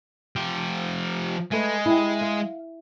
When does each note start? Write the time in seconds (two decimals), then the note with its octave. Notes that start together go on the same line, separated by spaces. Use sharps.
0.36 F3 G4
1.52 G#3 A3 B4
1.86 E4 G4
2.21 F5